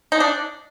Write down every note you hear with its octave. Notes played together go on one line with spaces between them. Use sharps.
D#4
D4